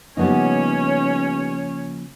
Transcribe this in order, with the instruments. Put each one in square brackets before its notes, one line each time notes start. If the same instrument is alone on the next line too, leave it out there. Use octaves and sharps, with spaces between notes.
[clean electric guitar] C#3 F3 A#3 [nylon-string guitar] G3 B3 D#4 [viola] C#4 C#5